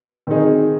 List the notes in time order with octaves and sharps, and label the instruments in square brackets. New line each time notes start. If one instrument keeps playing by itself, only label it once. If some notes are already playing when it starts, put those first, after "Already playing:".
[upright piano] D#3 C4 D#4 G#4